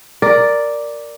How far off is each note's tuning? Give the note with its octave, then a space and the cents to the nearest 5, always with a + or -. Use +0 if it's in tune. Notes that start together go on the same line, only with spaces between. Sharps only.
A#4 +0 D5 +0